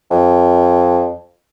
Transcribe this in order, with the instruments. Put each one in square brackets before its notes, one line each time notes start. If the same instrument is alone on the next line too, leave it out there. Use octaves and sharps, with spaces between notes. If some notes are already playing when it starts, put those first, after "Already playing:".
[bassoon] F2